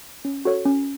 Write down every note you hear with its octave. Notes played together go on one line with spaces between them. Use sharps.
C#4
F#4 A4 C#5
C#4